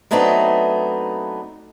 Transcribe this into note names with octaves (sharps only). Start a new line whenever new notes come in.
F#3 A3 B3 C4 D4 D#4